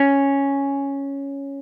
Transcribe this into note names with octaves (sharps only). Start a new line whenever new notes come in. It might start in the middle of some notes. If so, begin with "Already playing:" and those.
Already playing: C#4